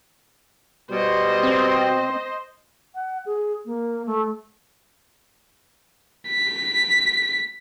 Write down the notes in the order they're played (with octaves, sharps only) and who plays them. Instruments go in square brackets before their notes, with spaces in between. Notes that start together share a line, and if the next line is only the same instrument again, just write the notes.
[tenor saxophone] B2 [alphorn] G3 [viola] C5 D#5
[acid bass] C4
[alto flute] F#5
G#4
A#3
A3
[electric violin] B6